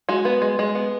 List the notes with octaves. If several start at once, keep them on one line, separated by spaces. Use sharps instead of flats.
G#3 F#4
B3
G#3
G#3
B3